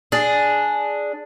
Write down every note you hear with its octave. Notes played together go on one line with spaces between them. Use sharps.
D4 G#4